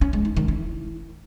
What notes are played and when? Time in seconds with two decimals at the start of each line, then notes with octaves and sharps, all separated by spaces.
0.01 C#4
0.13 G#3
0.25 D#4
0.36 D#3
0.48 E4